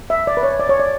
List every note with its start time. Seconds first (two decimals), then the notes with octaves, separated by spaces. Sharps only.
0.10 E5
0.27 D5
0.37 B4
0.43 C#5
0.60 D5
0.69 C#5
0.80 D5